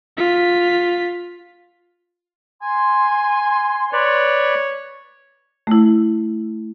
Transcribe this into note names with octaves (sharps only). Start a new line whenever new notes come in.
F4 B6
G#5 C6
B4 C#5 D5
A3 E4